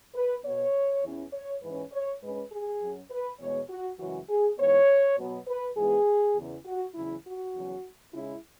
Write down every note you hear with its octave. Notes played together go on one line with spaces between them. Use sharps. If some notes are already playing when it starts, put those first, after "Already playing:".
B4
B2 B3 C#5
E2 E3 C#4
C#5
G#2 E3 C#4 B4
C#5
G#2 G#3 C#4 B4
G#4
F#2 F#3 C#4
B4
E2 B2 G#3 B3 C#5
F#4
F#2 C#3 E3 G#3 C#4 F#4
G#4
G#2 E3 B3 C#5
B2 F#3 B3
B4
G#2 E3 G#3 B3 G#4
E2 C#3 E3
F#4
E2 C#3 F#3 E4
F#4
E2 C#3 F#3 C#4
C#3 G#3 C#4 E4